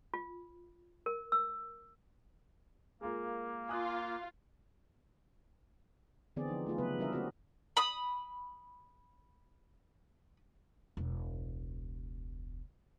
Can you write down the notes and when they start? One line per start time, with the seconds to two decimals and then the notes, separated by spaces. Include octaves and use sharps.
0.14 F4
1.06 A#4
1.32 E6
3.01 G#3 A#3 F4 A#4
3.69 F4 G#5 D#6 F#6
6.36 D3 E3 B3 C4 G#4 D5
6.48 F3 D#4
6.66 A3 D#4 F4 G#4
6.78 C#3 F#3 B3 B4
6.98 E3 G3 D4 A#4 D#5 E5
7.13 A#3 C4 F#4 G#4 B4
7.77 B5 D#6
10.97 E1 C#2